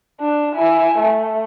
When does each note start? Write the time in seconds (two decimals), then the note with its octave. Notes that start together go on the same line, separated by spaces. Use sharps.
0.21 D4
0.54 E4 G#5
0.98 A3